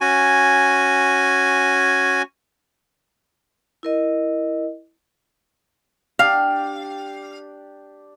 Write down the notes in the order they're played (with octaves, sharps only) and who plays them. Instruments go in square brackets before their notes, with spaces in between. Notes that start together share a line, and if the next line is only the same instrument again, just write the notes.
[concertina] C#4 F#4 G#5
[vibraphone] E4 A#4 D#5
[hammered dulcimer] D4 G4 [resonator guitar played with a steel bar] F5